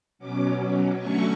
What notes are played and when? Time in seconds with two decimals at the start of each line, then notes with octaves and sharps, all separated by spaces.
0.19 B2 F#3 C#4 D6
0.99 D3 F#3 A3 C#4 C#6